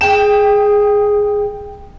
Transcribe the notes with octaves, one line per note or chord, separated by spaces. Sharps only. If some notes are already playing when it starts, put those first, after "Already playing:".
G#4 G5 E7